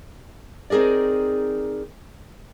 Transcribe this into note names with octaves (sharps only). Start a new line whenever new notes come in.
C4 D#4 G#4 A#4 D5